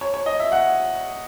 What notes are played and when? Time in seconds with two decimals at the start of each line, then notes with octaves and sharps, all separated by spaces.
0.01 C#5
0.14 C#5
0.26 D#5
0.40 E5
0.52 F#5